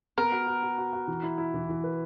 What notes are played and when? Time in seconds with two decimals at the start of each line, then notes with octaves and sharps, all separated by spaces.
0.18 B3 A#4
0.32 F#4
0.47 F#4
0.63 F#4
0.78 F#4
0.93 F#4
1.08 E3
1.23 E4
1.38 E4
1.54 E3
1.69 E3
1.84 B4